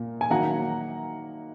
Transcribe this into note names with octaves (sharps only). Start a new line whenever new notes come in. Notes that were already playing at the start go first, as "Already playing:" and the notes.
Already playing: A#2 A#3
G#5
D#3 F#3 A#3 F#5 A#5